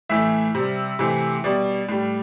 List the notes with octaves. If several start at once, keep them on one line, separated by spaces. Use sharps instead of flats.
A2 E3 A3 E5
C3 G3
C3 E3 A3
B2 G3 D5
A2 G3